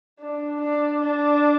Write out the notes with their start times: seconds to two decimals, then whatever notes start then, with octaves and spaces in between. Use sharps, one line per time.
0.20 D4
0.61 D4
1.01 D4